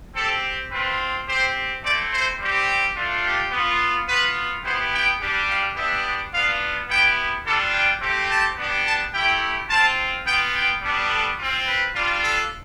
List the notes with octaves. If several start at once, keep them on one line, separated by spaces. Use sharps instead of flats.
C4 G4 A4
C4 F4 B4
C4 G4 C5
A3 C4 E4 D5
C5
G3 C4 G4
A3 D4 F4
G4
B3 F4
B3 F4 B4
B3 E4 G4 C5
G5
G3 D4 G4
F5
B3 D4 G4 E5
B3 D4 F4 F5
B3 E4 G4 G5
G3 D4 F4 A4
G5
A3 C4 G4
A5
B3 D4 G4
A5
A3 E4 G4 G5
C4 F4 A5
B3 F4 G5
G5
G3 B3 D4
A4
C4 F4
B4
G3 D4 F4
A4